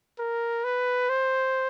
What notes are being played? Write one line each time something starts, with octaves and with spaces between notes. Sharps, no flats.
A#4
B4
C5